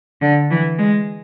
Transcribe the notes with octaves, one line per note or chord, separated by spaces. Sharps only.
D3
E3
G#3